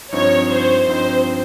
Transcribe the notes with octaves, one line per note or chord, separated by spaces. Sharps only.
G2 F3 C4 D#4 C#5
C5
G2 F3 C4 D#4 C5